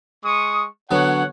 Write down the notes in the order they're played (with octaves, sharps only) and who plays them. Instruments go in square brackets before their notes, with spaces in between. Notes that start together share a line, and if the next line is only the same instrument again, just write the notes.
[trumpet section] G#3 C#6 D#6
[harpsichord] D3 F#3 B3 [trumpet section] C#5 F#5